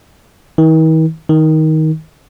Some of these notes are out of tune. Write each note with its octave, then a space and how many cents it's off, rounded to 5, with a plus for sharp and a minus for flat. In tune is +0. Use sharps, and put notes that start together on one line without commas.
D#3 +45
D#3 +15